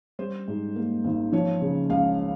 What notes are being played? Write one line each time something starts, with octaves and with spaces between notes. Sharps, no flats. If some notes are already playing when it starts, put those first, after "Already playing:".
G3 C5
G#2
A#3
G#1
F3 C#5
C#3
C#2 F5